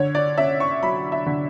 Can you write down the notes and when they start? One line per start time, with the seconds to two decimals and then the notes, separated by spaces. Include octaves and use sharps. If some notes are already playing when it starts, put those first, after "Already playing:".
Already playing: D3 C#5
0.15 D5
0.38 C#4 E5
0.60 C#6
0.82 F#3 B5
1.12 E5
1.26 D3